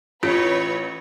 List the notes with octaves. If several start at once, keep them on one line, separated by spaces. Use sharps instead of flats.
A1 F4 B4 C#5